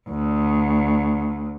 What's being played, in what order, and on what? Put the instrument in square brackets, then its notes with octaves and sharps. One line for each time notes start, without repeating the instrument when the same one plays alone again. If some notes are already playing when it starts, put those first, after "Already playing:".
[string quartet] D2